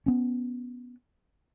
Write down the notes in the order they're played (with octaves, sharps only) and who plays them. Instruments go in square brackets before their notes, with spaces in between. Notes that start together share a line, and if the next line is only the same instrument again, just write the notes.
[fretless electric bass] B3 C#4